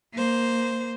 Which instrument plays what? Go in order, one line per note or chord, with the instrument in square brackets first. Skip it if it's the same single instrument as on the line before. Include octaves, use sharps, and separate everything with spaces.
[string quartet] A#3 C5